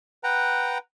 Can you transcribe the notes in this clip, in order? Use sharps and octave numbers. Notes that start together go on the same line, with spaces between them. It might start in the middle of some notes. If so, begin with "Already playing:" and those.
B4 F#5 G5 A#5